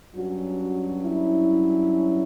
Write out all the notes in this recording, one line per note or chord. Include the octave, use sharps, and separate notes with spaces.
G2 F#3 C#4 F#4
E4